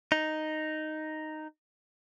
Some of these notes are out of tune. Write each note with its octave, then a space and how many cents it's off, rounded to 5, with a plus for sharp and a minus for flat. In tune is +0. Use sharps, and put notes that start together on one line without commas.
D#4 -5